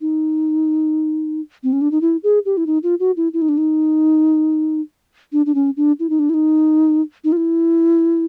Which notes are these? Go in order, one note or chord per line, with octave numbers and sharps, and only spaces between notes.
D#4
C4
C#4
D4
D#4
E4
G#4
G4
E4
D#4
F4
F#4
E4
E4
D#4
D4
D#4
D4
D4
C#4
D4
E4
D#4
D4
E4
D#4
D#4
F4
E4